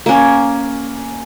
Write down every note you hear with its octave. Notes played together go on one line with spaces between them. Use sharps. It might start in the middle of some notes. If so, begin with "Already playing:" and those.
A#3 C#4